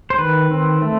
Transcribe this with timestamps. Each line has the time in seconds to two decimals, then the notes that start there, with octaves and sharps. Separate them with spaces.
0.10 C5
0.18 D#3 B4
0.51 C4
0.82 A3